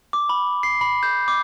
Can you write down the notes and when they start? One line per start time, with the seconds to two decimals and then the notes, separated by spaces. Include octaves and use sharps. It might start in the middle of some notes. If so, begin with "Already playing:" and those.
0.13 D6
0.29 B5
0.63 C7
0.81 B5
1.03 G6
1.28 D6